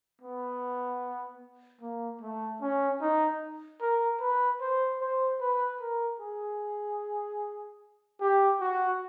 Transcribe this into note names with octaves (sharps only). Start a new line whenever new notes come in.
B3
A#3
A3
C#4
D#4
A#4
B4
C5
C5
B4
A#4
G#4
G4
F#4